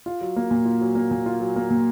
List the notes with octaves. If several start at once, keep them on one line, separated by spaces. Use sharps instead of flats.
F4
F#3
A#3
A#2
F4
F#3
A#3
A#2
F4
F#3
A#3
A#2